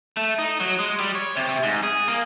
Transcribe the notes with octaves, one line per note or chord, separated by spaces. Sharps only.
A3
D#4
F#3
G#3
G3
C#5
C3
G#2
G#4
A#3